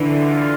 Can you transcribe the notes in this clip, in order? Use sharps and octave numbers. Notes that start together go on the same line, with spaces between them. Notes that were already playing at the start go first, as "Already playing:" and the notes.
Already playing: D3 E3
F4